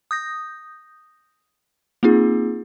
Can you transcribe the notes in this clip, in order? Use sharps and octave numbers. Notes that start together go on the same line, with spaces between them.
D#6 G6 A#6
A#3 C4 D#4 F4 G#4